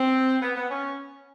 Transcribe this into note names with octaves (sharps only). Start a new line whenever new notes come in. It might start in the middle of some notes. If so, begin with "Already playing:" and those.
Already playing: C4
B3
B3
C#4